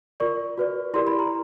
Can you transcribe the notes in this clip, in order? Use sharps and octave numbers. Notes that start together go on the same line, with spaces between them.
F4 A#4 D5 C#6
F#4 B4 D5
E4 G4 A#4 D5 C6
B5
A#5